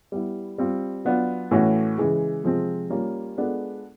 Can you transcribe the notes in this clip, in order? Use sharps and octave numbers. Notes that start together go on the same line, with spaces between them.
G3 B3 E4
G3 C4 F4
F#3 B3 D4 F4
A2 E3 A3 C#4 F#4
C#3 E3 G#3
C3 F3 G#3 C4
G3 A#3 C#4 F4
G#3 B3 D4 F4 A4